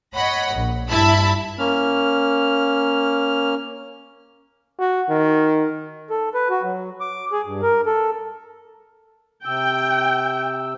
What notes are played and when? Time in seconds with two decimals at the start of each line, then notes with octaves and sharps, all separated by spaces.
0.15 C#5 D#5 F#5 B5
0.55 A#1
0.89 G2 E4 E5 A5 B5 E6
1.59 A#3 C#4 F6
4.79 F#4
5.09 D#3
6.10 A4
6.34 B4
6.50 F#4
6.63 F#3
7.00 D6
7.32 G#4
7.46 G2
7.62 A#4
7.86 A4
9.45 C3 G5 E6